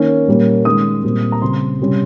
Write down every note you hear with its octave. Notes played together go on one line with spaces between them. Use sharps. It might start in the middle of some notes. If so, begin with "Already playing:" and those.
Already playing: D#3 A#3 C#4
A#2 G3 A#3 C#4
D#3 G#3 C#4 D#6
A#2 G3 C4
A#5
C#3 G3 C4 C6
C3 G3 C#4